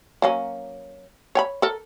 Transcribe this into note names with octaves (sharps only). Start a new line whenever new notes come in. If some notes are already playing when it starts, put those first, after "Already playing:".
F#3 A#3 C#4
C#5 G5 B5
A4 A#4